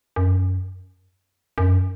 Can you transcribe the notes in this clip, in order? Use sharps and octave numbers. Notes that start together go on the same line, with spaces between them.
F#2
F#2